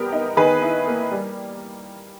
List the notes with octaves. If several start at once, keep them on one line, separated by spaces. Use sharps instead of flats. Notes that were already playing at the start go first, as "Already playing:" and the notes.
Already playing: G3 B3 G4 A#4
D#4
D#3 G#4 B4
E4
A#3
G3